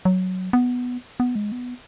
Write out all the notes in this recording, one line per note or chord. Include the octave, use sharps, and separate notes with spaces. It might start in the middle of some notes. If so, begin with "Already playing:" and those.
F#3
B3
B3
G#3
B3